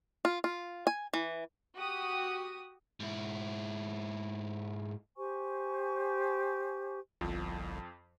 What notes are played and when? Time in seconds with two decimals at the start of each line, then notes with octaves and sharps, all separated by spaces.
0.25 F4
0.44 F4
0.87 G#5
1.13 E3
1.75 F#4 G4 D#6
3.00 G#2 E4
5.16 G4 C5 G#5 C#6
7.21 G1 C2 F2 F3